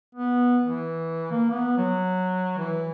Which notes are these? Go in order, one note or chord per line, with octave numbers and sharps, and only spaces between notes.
B3
E3
A#3
B3
F#3
E3